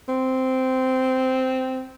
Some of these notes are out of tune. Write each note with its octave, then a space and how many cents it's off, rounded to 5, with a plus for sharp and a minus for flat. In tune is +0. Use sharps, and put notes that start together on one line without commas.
C4 -10